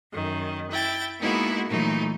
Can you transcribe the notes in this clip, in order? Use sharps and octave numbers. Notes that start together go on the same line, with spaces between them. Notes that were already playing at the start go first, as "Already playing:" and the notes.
F#2 D#3
E4 G5 A6
G#3 A#3 B3 D#4 E4 F#4
A#2 E3 F#3 A3 D#4